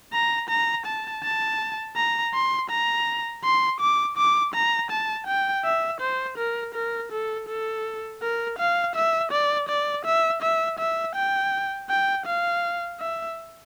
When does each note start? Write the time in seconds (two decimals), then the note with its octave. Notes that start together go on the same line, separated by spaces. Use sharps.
0.13 A#5
0.49 A#5
0.86 A5
1.24 A5
1.96 A#5
2.34 C6
2.70 A#5
3.44 C6
3.80 D6
4.17 D6
4.54 A#5
4.91 A5
5.27 G5
5.65 E5
6.00 C5
6.38 A#4
6.75 A#4
7.12 A4
7.48 A4
8.22 A#4
8.59 F5
8.95 E5
9.32 D5
9.69 D5
10.05 E5
10.42 E5
10.79 E5
11.15 G5
11.89 G5
12.26 F5
13.00 E5